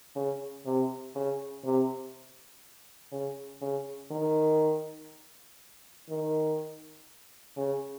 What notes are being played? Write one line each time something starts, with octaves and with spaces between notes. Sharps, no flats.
C#3
C3
C#3
C3
C#3
C#3
D#3
D#3
C#3